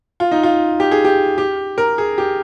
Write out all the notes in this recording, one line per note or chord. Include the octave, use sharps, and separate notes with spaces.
F4
D#4
F4
G4
G#4
G4
G4
A#4
G#4
G4